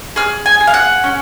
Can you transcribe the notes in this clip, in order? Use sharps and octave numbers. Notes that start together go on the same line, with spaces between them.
G#4 F6
G#5
G#4
F5
F#5
C#4